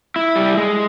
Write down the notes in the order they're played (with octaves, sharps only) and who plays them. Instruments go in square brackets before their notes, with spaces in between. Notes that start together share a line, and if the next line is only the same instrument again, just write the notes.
[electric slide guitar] E4
G3
G#3